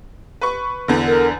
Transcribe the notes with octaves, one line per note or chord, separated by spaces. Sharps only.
B4 C#6
E2 D3
A#4